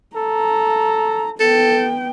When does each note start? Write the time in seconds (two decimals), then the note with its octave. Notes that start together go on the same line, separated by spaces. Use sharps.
0.16 A4 A#5
1.40 B3 A4 G5